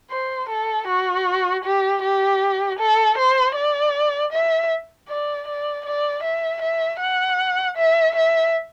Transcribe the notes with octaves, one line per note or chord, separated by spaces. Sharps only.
C5
A4
F#4
G4
G4
A4
C5
D5
E5
D5
D5
D5
E5
E5
F#5
E5
E5